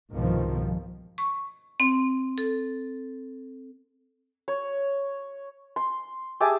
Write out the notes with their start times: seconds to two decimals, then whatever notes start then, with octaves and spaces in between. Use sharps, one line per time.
0.12 C2 G#2 B2 D#3 F3
1.18 C#6
1.80 C4
2.38 A4
4.48 C#5
5.76 C6
6.40 G4 G#4 E5 A5